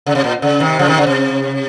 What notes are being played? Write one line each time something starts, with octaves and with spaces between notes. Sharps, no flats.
C#3
C3
A#2
C#3
C3 D#3
C#3 F3
C3 D#3
C#3
C3